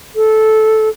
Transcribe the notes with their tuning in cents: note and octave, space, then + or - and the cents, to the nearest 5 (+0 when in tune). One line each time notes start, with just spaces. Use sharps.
A4 -10